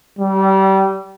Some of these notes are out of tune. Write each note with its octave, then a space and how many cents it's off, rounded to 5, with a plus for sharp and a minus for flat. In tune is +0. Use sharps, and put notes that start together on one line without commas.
G3 -25